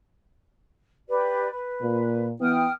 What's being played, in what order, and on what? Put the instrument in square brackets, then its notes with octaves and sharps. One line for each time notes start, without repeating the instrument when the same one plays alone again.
[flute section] G4 B4 D5
B4
[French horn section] A#2
[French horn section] E3 B3 [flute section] G5 D#6 F6